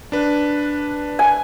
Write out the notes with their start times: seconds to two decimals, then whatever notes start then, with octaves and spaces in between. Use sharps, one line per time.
0.12 D4 B4
1.19 G#5